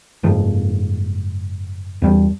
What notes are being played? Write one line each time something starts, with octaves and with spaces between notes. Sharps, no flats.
F#1 G#2 F3
E2 G3